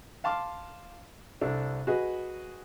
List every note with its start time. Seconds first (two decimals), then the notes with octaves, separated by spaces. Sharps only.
0.24 F5 A5 C6 D6 F6
1.41 C2 D4 A4
1.87 F#4 G#4 B4 D#5